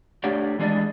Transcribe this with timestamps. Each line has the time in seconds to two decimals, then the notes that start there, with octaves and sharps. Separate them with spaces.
0.24 A3 D4 G4 C#5 D5
0.59 E3 G#3 C4 D4 D5 D#5